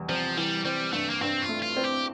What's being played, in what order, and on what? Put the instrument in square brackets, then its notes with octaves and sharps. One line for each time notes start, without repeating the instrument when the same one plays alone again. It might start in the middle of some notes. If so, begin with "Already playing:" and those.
Already playing: [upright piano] E2 C3 G3
[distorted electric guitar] F3 [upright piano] C4
[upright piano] E3 [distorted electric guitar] G3
[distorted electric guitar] G3 [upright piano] C4
[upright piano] G2 [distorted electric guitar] A3
[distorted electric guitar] A#3
[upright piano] G2 [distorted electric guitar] C4
[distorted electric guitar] F4
[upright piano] A3
[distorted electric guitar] F4
[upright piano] C4
[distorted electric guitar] G4